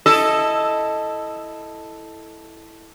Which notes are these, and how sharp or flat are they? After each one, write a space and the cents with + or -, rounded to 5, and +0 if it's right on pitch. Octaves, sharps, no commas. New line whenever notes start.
E4 +0 A4 +0 D#5 +0